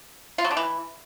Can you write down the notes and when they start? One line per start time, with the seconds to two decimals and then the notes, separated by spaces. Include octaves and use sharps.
0.38 F4
0.44 F#3
0.51 D3
0.57 E3